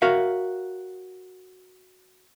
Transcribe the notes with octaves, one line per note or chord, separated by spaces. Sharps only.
F#4 A#4 C#5 E5 F5